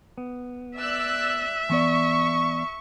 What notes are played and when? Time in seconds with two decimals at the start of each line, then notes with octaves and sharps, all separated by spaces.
0.18 B3
0.78 D5 E5 E6 F#6
1.70 E3 B3 D5 C#6